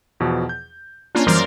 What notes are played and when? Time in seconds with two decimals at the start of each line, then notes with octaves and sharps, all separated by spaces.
0.20 E2 B2 F3
0.49 G6
1.15 A#3 C#4 D4 F4
1.27 F#2 E3 G3 A#4 C5 D5